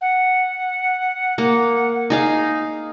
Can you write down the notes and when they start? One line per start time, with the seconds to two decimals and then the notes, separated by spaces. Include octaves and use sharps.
0.01 F#5
1.38 A#3
2.10 D#4 G#4 F5